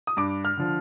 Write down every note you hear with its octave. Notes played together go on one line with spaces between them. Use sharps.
D#6
G2 D6
F6
D3 F3